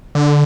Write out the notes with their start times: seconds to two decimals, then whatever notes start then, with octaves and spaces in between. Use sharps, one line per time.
0.15 D3